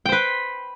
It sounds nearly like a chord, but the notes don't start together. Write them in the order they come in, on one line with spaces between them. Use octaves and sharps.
G5 C5 B4